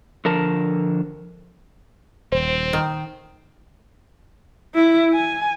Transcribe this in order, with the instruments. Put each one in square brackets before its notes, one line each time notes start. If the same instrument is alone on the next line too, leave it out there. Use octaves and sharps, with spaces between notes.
[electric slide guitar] D3 F3 A#4 A5
[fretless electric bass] D#1 [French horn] C4 [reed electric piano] C5
[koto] D#3
[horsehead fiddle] E4
G#5